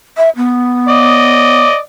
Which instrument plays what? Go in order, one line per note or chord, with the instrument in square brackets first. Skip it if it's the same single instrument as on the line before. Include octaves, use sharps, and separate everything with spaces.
[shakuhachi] E5
B3
[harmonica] D5 D#5